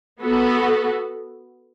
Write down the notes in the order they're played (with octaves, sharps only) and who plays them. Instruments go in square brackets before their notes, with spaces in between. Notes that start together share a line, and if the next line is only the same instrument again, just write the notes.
[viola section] B3 F#4 A4